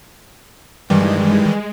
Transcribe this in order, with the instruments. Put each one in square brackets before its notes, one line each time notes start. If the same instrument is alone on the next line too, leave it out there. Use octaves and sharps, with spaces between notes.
[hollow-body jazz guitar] G2 [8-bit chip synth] D#3 E3 G3 [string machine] G#3